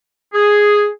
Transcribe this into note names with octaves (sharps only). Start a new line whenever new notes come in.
G#4